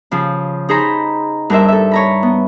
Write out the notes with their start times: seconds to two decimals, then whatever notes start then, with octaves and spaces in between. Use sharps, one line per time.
0.11 C#3 F3
0.69 D#4 G#4 C5 A#5 B5
1.50 G2 G4 A#4 C5 E5
1.68 A4 E5
1.91 C#5 A#5 B5
2.23 B3